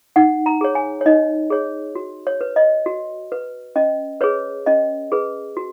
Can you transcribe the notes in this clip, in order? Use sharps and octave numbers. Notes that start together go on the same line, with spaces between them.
D#4 F#5
A#5
G#4 C#5
G#5
C#5
D#4 D#5
G#4 C#5
F#4
C#5
B4
D#5
F#4
B4
C#4 D#5
G#4 B4 C#5
C#4 D#5
G#4 B4
F#4